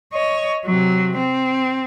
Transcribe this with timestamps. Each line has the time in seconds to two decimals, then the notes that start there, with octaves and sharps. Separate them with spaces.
0.13 C#5 D#5
0.66 C3 F#3
1.17 C4